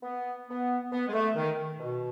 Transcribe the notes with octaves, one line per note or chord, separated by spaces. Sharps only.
B3
B3
B3
G#3
A3
D#3
B2